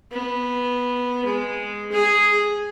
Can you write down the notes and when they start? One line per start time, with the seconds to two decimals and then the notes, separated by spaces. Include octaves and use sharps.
0.12 B3
1.25 G#3
1.92 G#4